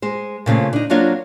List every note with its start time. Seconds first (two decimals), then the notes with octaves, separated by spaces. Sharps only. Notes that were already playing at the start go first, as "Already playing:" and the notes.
0.02 G#3 C5
0.46 A#2 C#3 A3 C4
0.73 D4 D#4
0.90 F#3 A#3 C4 D4 F4 C#5